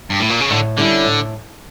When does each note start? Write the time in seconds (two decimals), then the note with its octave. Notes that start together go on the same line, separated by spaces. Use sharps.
0.10 G2
0.20 A2
0.30 A#2
0.40 C#3
0.50 A2 D3
0.77 D3 G3 C#4 E4
1.05 A2